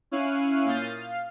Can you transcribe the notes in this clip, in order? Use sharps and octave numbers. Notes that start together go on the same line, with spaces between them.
C#4 E4 C#5 F5 F#6 D#7
A#2 F5 D#6 G6 A6
F5